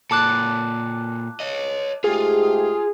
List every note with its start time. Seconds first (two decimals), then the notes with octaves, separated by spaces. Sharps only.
0.11 A#2 A4 A5 D6 F#6
1.40 C#5 D#5
2.04 G#2 A3 F4 G4 G#4